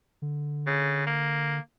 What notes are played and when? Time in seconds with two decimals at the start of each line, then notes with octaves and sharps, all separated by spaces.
0.22 D3
0.67 C#3
1.07 A#3